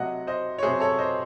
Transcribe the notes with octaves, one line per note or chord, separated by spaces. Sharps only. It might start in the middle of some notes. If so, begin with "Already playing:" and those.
Already playing: C3 F#3 A3 D#5 F#5
C5 D#5
C#5
C3 F#3 A3 G#4 C5
A4 C#5
C5 D#5